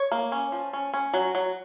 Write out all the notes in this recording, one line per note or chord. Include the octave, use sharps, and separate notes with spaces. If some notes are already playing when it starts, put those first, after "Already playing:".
Already playing: C#5
A#3
C#4
F3
C#4
C#4
F#3
F#3